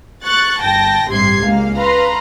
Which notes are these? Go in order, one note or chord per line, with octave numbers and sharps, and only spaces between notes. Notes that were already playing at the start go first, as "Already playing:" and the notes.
C#6 F#6 A6
G1 G5 A5 A#6
A1 G2 C3 C6 G#6 C7
C#2 G#3 A#3 F5
B4 F5 A#5 C6